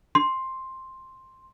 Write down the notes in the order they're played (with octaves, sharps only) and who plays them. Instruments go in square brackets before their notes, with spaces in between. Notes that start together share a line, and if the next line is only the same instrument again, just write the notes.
[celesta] C6